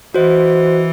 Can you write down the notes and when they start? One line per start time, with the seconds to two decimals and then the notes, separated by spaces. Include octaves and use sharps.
0.14 E3 F#4 C5 D#5